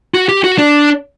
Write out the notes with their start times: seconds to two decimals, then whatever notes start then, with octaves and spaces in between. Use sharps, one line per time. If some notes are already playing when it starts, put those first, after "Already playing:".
0.14 F#4
0.29 G4
0.44 F#4
0.58 D4